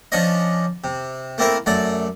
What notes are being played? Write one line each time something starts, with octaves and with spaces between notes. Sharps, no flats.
F3 C#4 D4 C#5 D#5
C3
A3 A#3 C4 E4 A#4
F#2 A3 D5